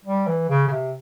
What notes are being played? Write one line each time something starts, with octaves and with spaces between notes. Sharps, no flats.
G3
E3
C#3
C#3
C3